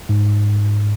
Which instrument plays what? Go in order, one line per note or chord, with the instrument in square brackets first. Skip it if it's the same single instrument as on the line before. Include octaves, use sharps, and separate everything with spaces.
[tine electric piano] G#2